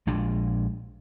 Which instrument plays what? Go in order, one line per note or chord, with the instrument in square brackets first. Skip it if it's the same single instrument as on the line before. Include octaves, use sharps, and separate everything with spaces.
[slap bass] A#1 G#3 D4